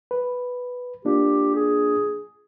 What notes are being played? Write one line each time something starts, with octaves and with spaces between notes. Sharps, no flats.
B4
A#3 D4 F4 G4
G#4